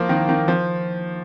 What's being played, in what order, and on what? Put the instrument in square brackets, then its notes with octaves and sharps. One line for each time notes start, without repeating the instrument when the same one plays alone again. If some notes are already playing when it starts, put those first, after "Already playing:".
Already playing: [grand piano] F3 A#3
D#3
D#3
F3